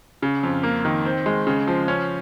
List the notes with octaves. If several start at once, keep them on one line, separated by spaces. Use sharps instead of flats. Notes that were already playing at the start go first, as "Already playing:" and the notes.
C#3
F2
A#3
D#3
C4
G#3
C#3
F3
C#4